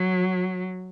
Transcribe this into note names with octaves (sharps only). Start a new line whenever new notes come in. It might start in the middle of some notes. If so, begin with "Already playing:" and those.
Already playing: F#3